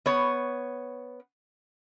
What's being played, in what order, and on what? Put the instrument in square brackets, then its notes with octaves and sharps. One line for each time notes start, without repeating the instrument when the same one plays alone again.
[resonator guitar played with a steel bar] B3 C#5